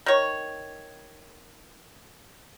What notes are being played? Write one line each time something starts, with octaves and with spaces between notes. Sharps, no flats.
D#3 C#5